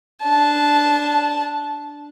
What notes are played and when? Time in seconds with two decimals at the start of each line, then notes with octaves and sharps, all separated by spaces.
0.23 D4 A5